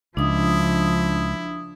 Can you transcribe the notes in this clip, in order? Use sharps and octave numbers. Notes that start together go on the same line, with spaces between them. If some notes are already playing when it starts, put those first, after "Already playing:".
C#2 F3 D4 E4 D#6